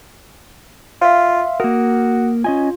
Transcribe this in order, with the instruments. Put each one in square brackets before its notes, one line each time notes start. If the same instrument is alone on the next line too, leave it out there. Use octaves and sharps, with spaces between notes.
[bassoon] F4 [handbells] E5 F5 C6
[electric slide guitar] A#3 A#4 [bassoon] F#4 [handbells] D#6
[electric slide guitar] C#4 D#5 G#5 [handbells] F4